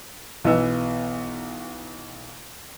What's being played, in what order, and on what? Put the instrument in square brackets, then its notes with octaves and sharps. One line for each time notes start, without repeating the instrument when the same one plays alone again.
[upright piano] B1 E3 B3 E6